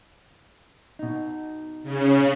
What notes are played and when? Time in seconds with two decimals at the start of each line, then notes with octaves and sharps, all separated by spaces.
0.99 B2 D#4
1.83 C#3